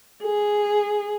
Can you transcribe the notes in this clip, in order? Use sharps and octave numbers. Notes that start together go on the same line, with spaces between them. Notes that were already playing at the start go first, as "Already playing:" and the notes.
G#4